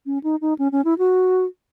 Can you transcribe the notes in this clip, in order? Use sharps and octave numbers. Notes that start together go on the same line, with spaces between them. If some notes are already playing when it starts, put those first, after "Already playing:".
C#4
D#4
D#4
C#4
C#4
E4
F#4